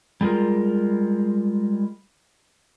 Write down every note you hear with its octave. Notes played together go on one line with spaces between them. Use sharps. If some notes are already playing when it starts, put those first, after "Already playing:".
G3 G#3 F4 A#4